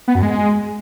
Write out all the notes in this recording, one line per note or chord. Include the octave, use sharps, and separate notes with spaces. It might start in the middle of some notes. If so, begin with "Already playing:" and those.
B3
F#2
G#3